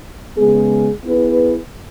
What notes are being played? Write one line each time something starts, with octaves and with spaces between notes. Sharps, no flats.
C#3 G#3 B3 G#4
B3 E4 G#4 B4